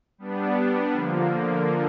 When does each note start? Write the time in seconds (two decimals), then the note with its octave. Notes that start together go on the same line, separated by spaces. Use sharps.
0.18 G3 B3 D4
0.93 D3 F3 A#3